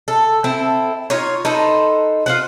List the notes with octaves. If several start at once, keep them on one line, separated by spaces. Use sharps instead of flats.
A4
C4 E4 A4
D#4 F4 C#5
D#4 A4 B4 C5
F4 C5 F#5